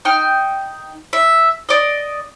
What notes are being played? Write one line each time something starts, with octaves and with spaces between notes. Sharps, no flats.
D#4 G5 F6
E5
D5 D#5